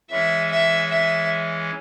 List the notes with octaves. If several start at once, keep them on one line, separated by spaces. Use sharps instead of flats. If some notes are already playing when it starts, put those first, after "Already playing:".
E3 G#3 C#4 E5
E5
E5